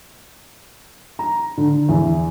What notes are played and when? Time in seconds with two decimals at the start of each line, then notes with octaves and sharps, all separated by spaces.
1.19 A#5
1.58 D3
1.89 E2